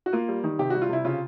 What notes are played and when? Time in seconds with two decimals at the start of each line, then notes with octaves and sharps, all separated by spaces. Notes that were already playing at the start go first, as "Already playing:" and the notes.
0.06 F#4
0.13 A#3 F4
0.28 G3
0.44 D#3
0.59 C3 G4
0.70 G3 F#4
0.82 F4
0.89 C3 E4
1.05 C#3 F4